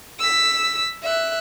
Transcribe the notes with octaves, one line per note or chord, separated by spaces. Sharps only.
E6 B6
E5 F#6